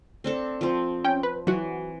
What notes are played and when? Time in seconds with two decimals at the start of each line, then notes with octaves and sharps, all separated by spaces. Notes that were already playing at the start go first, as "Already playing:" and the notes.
0.24 C4 D4 A4
0.61 F3 C4
1.04 C#4 G5
1.23 B4
1.47 E3 F#3 F#4